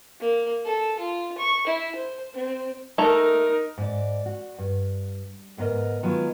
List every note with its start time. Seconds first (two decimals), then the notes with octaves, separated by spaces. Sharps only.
0.21 A#3
0.65 A4
0.99 F4
1.38 C#6
1.66 E4
1.95 C5
2.34 C4
2.98 A3 D#4 A#4 A#5
3.78 G#2 D5
4.26 F#4
4.58 G2
5.57 D2 G#2 B3 A#4 D#5
6.03 D#3 F#3 G#3 B3 F4